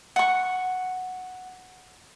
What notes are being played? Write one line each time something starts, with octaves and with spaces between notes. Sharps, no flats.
F#5 C#6